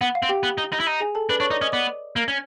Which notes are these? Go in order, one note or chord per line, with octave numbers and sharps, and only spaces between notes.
B3 F#5
F5
C4
G4 G5
B3
D#4
D#4
E4
D#4
G#4 G#5
A4 A5
D4 B4 B5
D4 C#5 C#6
D#4 D5 D6
C#4 D#5 D#6
B3 D5 D6
A#3
C#4